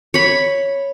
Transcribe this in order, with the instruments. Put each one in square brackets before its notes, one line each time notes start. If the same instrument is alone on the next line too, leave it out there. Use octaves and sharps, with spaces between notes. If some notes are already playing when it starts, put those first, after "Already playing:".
[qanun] C#5 B5